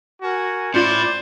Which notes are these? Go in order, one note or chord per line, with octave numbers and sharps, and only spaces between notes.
F#4 A#4 G#5
A2 C#4 E4 F4 C5 D5